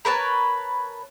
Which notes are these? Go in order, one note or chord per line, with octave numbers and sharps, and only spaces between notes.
A#4 B4 C#5 A5